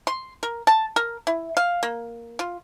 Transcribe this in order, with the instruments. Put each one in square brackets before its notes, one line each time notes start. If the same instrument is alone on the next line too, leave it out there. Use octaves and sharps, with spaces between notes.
[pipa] C6
A#4
A5
A#4
E4
F5
A#3
F4